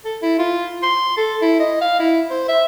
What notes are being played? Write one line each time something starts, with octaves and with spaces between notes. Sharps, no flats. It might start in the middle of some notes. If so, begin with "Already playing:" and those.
A4
E4
F4
C6
A4
E4
D#5
F5
E4
C5
E5